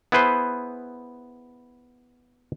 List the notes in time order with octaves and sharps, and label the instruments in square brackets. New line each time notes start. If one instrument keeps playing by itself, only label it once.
[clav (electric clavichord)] B3 E4 G#4 B4 C5